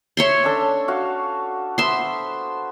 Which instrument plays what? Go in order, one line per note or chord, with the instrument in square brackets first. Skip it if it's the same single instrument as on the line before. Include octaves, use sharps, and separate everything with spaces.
[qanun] C#5 E5 C6
[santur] C#4 D4 A4
F#4 F5
[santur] B3 C5 [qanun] E5 C6